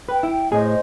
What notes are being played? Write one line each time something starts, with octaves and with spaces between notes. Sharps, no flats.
B4 G5
E4
A2 G#4 C5 D#5